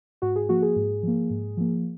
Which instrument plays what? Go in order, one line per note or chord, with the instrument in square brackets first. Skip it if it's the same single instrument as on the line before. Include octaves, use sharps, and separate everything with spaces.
[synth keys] G#2 F#4
G#4
F3 A#3 F#4
G#4
G#2
F3 A#3
G#2
F3 A#3